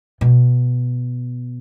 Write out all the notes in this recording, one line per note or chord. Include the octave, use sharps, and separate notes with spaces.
B2